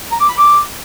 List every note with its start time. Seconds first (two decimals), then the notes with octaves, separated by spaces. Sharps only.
0.11 A#5
0.20 D6
0.29 B5
0.37 D6